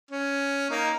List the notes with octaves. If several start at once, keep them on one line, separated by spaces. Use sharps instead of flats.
C#4
A#3 D#4